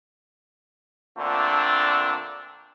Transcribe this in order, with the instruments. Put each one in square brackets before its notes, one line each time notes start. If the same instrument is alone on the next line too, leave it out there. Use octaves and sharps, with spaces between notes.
[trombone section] A#2 D3 A3 C4 D4